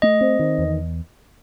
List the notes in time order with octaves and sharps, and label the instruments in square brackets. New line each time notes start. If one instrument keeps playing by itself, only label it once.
[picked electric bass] A3 [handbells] D#5
[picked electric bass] C4
D#3
E2